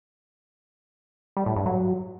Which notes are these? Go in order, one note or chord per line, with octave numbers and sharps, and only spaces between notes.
G3
A2
G2
F#3